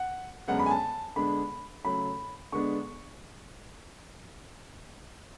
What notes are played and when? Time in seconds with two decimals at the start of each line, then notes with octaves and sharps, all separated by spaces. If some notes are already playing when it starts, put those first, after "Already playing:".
Already playing: F#5
0.48 F#2 D3 G#3 B3 D4 F#5
0.59 B5
0.66 G#5
0.71 A5
1.16 D3 G#3 B3 D4 B5
1.84 C#3 F#3 A3 B5
2.52 D3 G#3 B3 D4 C#6